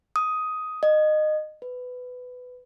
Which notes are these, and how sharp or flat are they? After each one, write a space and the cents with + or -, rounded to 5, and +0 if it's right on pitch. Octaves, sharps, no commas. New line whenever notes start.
D#6 +10
D#5 -20
B4 +15